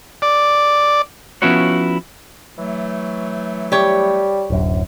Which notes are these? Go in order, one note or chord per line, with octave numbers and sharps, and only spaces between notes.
D5
F3 B3 C#4 E4 F#4 C#5
E3 F#3 A3
G3 G4 C#5
D1 F#2